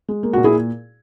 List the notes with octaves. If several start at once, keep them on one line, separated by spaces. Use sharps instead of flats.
G#3
A#3
A#2 F#4
E4 G#4